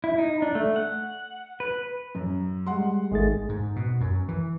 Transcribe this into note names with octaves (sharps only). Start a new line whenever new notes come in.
E4
D#4
D4
A3
F#5
B4
F#2
G3 G#3 F#5 C6
G#1 D#3 G#3 A3 G#4 A6
G#2
B2
F#2
E3